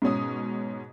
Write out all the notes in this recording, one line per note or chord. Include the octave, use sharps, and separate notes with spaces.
G#2 B2 C#4 D#6